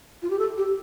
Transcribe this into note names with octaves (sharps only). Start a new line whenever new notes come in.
F4
G4
A4
G4